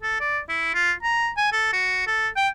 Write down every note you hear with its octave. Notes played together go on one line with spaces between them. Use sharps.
A4
D5
E4
F4
A#5
G#5
A4
F#4
A4
G5